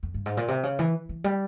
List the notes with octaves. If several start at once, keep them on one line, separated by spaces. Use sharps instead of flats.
F2
G2
G#2
A#2
C3
C#3
E3
E3
G3